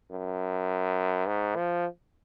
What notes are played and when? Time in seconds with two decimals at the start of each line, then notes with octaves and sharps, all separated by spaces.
0.11 F#2
1.27 G#2
1.56 F3